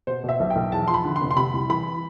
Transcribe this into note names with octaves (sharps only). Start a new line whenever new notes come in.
B2 C5
B2 E5
B1
G5
B1
E2 A5
F3 C6
B5
D3
C6
F1
C6
C3 B5
C2
E3 B5